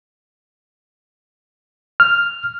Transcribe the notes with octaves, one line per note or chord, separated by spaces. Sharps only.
F6